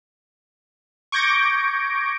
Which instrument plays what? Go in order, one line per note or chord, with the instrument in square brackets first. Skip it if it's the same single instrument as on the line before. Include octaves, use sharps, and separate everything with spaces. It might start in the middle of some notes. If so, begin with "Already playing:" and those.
[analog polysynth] C#6 D6 G6 G#6 A#6 D7